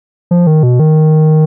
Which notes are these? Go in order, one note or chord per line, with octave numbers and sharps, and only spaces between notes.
F3
D#3
B2
D#3